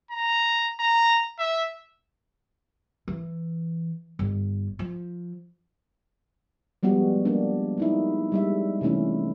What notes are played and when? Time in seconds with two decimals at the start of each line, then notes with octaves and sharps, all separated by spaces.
0.11 A#5
0.80 A#5
1.39 E5
3.08 E3
4.19 G1
4.79 F3
6.83 F3 G3 G#3 B3 F#4
7.25 A#3 D4
7.77 G#3 D#4 E4
8.32 G3 G#3 E5
8.81 C3 E3 A3 C#4 E4